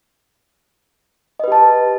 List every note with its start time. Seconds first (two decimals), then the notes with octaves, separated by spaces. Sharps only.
1.40 D#5
1.44 B4
1.48 G4
1.52 A5